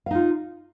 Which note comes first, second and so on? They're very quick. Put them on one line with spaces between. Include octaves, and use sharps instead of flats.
F5 D#4 F4